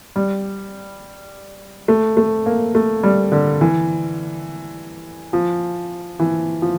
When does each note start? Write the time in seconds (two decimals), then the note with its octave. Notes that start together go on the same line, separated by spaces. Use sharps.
0.16 G3
1.88 A3
2.17 A3
2.46 A#3
2.75 A3
3.03 G3
3.32 D3
3.61 E3
5.33 F3
6.20 E3
6.62 F3